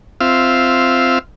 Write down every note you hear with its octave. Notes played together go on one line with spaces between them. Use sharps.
C4 F4 E5 F5